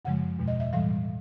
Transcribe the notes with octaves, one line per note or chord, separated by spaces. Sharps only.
F#2 C#3 F3 G#3 F#5
E2 B2 G#3
D#5
E5
A2 E3 G3 F5